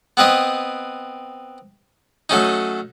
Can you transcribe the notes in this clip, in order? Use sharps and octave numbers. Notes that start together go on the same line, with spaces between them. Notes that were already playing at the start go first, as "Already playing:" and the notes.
B3 C4 B4 D#5
F#3 A3 C#4 D#4